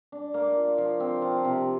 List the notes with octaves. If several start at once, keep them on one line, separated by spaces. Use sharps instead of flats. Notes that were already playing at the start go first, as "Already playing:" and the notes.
D4
A#3
F4
F3
C4
F3
C3